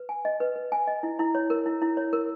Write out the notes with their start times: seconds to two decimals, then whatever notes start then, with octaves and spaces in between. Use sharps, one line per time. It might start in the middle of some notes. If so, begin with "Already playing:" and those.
Already playing: B4
0.09 G#5
0.25 D#5
0.40 B4
0.56 B4
0.72 G#5
0.87 D#5
1.03 E4
1.19 E4
1.35 C#5
1.50 A#4
1.66 E4
1.82 E4
1.97 C#5
2.13 A#4